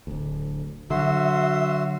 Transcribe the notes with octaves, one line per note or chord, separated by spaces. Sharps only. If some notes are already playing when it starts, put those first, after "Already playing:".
D1 D2
D3 F#3 F#4 E5 C6